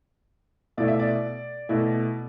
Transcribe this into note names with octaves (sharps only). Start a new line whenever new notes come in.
B2 A3 E4 D5
E5
D5
B2 A3 E4